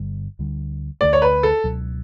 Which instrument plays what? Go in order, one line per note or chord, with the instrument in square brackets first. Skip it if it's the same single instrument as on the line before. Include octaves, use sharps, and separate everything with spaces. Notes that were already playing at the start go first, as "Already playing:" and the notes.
Already playing: [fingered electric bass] G1 G2 D3 G3
D2 D3 G3
[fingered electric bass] D2 D3 A3 [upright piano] D5
[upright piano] C#5
B4
A4
[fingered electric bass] C#2 B2 F#3